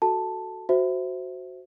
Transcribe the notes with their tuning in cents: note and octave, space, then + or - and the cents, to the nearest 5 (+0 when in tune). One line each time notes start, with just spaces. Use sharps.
F#4 +0 A4 +0 A5 +0
F#4 +0 C5 +0 E5 +0